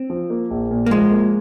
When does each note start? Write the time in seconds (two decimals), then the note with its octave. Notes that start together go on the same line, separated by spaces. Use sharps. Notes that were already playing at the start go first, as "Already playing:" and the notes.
Already playing: C4
0.10 F3
0.30 A#3
0.51 A#1
0.71 A#2
0.86 A#3
0.91 F3 G#3
1.11 A#3